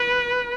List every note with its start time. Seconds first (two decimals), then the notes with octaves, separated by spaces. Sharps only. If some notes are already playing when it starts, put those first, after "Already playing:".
Already playing: B4